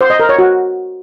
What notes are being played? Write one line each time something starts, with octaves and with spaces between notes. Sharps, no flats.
C5
D#5
A#4
C#5
F#4